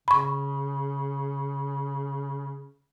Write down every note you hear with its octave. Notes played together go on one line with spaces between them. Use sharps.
C#3 B5 C#6